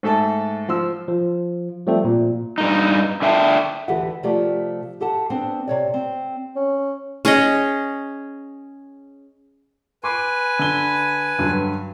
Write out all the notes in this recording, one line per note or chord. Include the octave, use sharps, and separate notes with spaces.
G#2 A3 A4 E5 A5
F3 C6 E6
F3
F3 G3 A3 C4 A4
A#2
G2 D#4
D3 E5 G5 A5
D2 E3 G4 A4 E5 F#5
C3 F3 A3 G4 D5
G4 A4 F#5 A5
B3 C4 D4
C3 C#5 D5
C4
C#4
C#4 G#4 C#5 D#5
B4 G#5 C6 D6
D3 G7
G2 D3 F#3